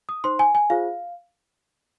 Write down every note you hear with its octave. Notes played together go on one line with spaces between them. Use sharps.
D#6
D#4 C5 C6
G#5
G#5
F4 G#4 C5 F5